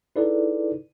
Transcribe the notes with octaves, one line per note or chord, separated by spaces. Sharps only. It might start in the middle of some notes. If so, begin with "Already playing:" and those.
D#4 E4 G#4 A4 B4 D5